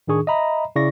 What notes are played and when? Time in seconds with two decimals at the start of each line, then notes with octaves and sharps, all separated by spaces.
0.07 A2 D#3 D4 G#4 C#6
0.27 D#5 E5 A#5 B5
0.76 C#3 E4 D5 C#6 A#6